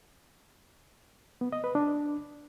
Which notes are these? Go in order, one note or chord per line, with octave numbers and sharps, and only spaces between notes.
B3
D#5
B4
D4